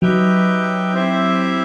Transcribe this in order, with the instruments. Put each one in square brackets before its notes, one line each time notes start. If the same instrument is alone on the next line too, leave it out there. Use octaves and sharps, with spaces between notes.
[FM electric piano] F#3 [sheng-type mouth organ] D#4 G4 B4 E5 G5
[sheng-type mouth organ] C4 E4 G4 C5 E5